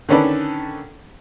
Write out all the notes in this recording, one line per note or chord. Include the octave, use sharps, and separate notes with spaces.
D3 D#3 C#4 A4 B4 D5